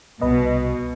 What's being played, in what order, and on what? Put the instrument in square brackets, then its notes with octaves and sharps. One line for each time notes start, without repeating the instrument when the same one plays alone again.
[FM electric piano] C2 B4 D#5 [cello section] B2